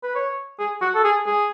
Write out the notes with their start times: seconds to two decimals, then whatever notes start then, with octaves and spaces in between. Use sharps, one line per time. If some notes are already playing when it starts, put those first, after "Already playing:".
0.03 B4
0.15 C#5
0.59 G#4
0.81 F#4
0.95 A4
1.04 G#4
1.26 G#4